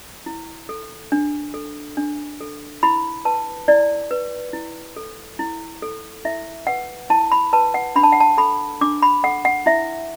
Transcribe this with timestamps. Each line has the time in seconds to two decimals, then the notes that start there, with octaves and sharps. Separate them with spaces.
0.26 E4
0.69 A4
1.12 D4
1.54 A4
1.97 D4
2.41 A4
2.83 E4 B5
3.25 B4 A5
3.68 E4 D5
4.11 B4
4.53 E4
4.96 A4
5.39 E4
5.82 A4
6.25 E4 E5
6.67 B4 F#5
7.10 E4 A5
7.32 B5
7.53 B4 A5
7.74 F#5
7.96 D4 B5
8.03 A5
8.12 F#5
8.20 A5
8.38 A4 B5
8.81 D4 D6
9.02 B5
9.23 A4 F#5
9.45 F#5
9.66 E4 E5